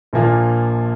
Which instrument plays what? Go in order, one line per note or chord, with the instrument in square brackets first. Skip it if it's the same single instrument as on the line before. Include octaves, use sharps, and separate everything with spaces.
[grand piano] A#1 A#2 F3 A#3 F4